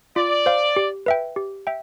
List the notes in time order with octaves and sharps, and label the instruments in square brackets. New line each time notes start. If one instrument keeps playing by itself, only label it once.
[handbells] F4 [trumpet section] D5
[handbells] C5 F5
G4
B4 E5 G5
G4
E5 G5